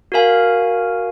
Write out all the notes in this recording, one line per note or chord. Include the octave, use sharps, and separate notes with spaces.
F#4 A#4 F5 G#5